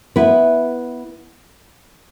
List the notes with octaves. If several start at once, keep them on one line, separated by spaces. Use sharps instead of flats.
B3 E4 B4